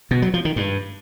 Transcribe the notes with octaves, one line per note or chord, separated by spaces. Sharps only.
B2
F#3
F3
D#3
G2